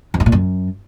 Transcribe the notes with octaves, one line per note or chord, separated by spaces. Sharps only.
F2
G2
A#2
F#2